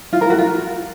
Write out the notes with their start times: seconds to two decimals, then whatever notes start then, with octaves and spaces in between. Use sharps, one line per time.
0.13 F4
0.21 A#4
0.30 F#4
0.38 F4